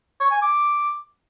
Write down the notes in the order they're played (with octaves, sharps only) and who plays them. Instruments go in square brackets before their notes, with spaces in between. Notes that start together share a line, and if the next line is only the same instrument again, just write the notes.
[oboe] C#5
G#5
D6